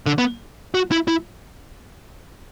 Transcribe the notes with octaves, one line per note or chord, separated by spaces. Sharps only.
D3
B3
F#4
E4
E4